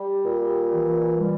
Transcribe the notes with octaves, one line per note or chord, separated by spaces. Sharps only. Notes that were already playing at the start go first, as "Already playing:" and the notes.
Already playing: G3 G4
A#2
E3
G3